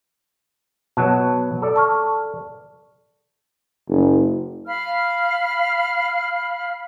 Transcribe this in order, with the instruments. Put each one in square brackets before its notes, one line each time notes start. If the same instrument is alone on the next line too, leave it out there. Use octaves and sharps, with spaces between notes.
[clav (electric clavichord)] B2 F#3 [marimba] A5 F#6
[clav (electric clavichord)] A4 D5
[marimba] A5 C#6 F6
[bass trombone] F#1
[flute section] F5 B5 F6